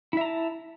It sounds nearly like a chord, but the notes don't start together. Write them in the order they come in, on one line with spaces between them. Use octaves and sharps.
E4 E5 A#5 A5